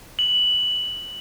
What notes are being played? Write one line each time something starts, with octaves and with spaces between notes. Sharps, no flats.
F#7